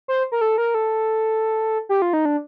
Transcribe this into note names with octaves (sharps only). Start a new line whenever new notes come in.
C5
A#4
A4
A#4
A4
G4
F4
D#4
D4